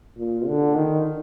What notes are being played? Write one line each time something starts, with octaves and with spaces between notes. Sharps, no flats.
A#2
D3
D#3